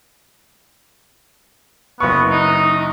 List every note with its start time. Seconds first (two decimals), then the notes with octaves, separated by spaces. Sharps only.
2.00 F#1 B3 C#6
2.31 D#4